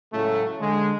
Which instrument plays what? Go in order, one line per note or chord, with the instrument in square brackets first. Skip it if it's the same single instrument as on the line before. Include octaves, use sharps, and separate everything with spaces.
[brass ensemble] A2 C#3 F#3 G#3 A3
D3 G#3